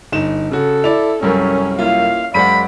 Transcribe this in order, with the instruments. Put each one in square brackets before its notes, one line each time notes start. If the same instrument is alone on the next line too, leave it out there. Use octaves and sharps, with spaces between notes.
[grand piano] G1 D#4 E7
[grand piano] C#3 F#4 [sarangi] A4
[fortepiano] E4 D5 [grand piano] F7
[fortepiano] C2 F#2 A#4 [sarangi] C#4
[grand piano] A#3 E4 F4 [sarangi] F5
[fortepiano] F#2 F#5 [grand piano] G#3 C5 D#7 [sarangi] D5 [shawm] B5